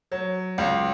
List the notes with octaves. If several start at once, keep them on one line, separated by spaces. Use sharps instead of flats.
F#3
C#2